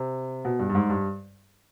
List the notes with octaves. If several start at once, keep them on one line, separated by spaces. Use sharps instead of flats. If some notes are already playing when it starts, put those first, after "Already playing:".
Already playing: C3
B2
G2
G2
G#2
G2